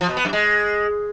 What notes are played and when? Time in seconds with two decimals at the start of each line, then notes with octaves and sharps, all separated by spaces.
0.01 F3
0.09 B2
0.17 B3
0.25 F#2
0.33 G#3